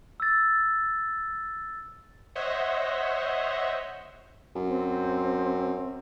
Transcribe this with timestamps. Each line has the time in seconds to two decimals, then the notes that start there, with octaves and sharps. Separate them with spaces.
0.20 E6 A6
2.35 C5 C#5 D#5 E5 F#5
4.56 F#2
4.68 C4